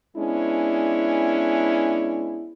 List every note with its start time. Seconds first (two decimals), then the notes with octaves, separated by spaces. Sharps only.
0.16 G#3 B3 C#4 D4 E4